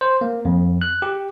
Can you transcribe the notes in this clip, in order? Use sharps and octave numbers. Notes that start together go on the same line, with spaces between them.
C5
A#3
F2
F#6
G4